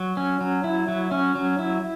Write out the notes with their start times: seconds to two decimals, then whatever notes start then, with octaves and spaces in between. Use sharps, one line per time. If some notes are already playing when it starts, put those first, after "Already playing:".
Already playing: F#3
0.17 C#4
0.41 F#3
0.64 E4
0.88 F#3
1.11 C#4
1.35 F#3
1.59 E4